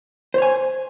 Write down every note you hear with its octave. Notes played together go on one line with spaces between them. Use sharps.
C5 C#5 G#5